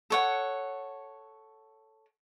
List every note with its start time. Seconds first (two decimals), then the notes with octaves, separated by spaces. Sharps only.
0.10 A4 C#5 F#5